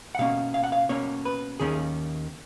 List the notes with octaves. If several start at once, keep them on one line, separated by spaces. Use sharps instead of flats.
F#5
B2 A#3 C#4 F5
F5
F#5
F5
B2 A#3 C#4 C#5
B4
D#2 D#3 A#3 C#4 G#4